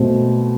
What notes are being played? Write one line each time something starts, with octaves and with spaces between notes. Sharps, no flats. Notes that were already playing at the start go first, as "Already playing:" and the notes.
Already playing: B2 A3 C4